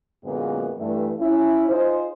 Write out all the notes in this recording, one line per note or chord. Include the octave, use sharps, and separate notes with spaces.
F#2 A#2 D3 G#3 A#3 B3
G2 E3 A3
C#4 E4
D#4 F4 G#4 C5